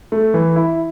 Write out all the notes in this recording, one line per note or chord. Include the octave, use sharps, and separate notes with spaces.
A3
E3
E4